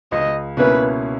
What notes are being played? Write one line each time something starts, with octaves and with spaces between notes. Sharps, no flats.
C#2 D#5
B2 A#3 C#4 E4 B4